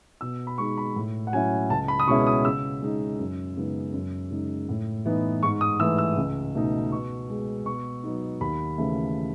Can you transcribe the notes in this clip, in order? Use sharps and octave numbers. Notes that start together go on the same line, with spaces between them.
B2 E6
B5
G#3 D#4 C#6
B5
A2
F#5
F#3 C#4 E4 G#5
C#2 A5
B5
D#6
B2 G#3 C#4 E4 C#6
D#6
C#3 E6
G#3 D#4
F#2
C#3 G#3 B3 D#4
F#2
C#3 G#3 D#4
A2
E3 B3 D#4
G#2 C#6
D#6
E3 A3 E6
E6
C#2
B2 A3 D#4
B2 C#6
G#3 B3
B2 C#6
F#3 B3 D#4
D#2 B5
C#3 E3 A3